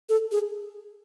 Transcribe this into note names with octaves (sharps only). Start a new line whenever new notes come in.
A4
G#4